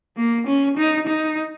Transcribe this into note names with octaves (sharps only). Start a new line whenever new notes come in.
A#3
C#4
D#4
D#4